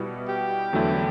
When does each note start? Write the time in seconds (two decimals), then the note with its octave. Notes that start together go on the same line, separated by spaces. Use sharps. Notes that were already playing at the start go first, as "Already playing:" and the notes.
Already playing: B2 G3 B3 E4
0.28 G4
0.73 E2 D3 F#3 A3 E4